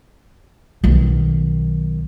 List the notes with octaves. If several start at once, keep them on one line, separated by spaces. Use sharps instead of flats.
B1 D#3